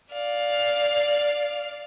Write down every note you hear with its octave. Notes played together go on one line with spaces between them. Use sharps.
D5 F5